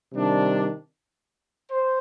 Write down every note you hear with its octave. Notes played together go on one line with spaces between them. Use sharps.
C3 D#3 G3 D4
C5